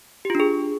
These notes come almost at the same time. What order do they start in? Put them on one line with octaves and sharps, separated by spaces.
G4 F4 D4 G#4